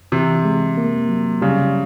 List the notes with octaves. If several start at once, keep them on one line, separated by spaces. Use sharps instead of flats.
C3 E3
G#3
A#3
F#3
C#3 G3